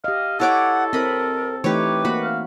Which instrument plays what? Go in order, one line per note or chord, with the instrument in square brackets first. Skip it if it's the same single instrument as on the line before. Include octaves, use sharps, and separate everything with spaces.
[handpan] G4 D#5 [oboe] F5
[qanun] E4 C#5 D6 [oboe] A4 [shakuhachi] F#5
[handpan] C4 [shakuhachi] A#4 [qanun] D#5 B5
[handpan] E3 A3 D#4 [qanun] G4 C#5 [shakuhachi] B4
[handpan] A#3 [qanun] F#4 B5
[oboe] F5